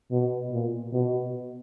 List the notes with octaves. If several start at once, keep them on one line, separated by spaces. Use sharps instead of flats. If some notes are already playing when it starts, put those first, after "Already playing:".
B2
A#2
B2